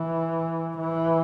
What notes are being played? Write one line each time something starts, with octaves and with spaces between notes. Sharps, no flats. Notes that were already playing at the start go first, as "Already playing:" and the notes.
Already playing: E3
E3